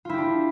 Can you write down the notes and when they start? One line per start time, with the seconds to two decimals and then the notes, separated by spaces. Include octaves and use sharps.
0.05 F4
0.09 E4
0.14 G4
0.18 D4